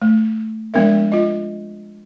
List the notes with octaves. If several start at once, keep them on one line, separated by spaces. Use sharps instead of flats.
A3
F3 G#3 B3 D4 A#4 E5
F4 D#5